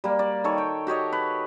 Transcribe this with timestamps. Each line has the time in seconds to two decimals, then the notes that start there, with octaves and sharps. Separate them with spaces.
0.04 G3 A#3
0.19 D5
0.44 D#3 A4 C#5
0.58 G5
0.87 F#4 G4 C#5 D#5
1.13 B4